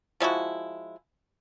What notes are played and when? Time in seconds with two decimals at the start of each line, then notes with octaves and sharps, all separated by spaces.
0.20 F3 G#3 E4 F#4